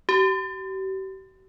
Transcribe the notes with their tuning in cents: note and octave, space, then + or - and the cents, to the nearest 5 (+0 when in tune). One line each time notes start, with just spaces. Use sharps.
G4 -40